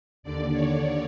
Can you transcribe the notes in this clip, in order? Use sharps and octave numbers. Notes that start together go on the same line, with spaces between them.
D#2 D3 D5
C#5